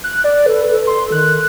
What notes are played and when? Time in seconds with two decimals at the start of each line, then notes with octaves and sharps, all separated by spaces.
0.04 F#6
0.24 D5
0.46 A4 B4
0.70 A4
0.87 C6
1.12 D#3 F#6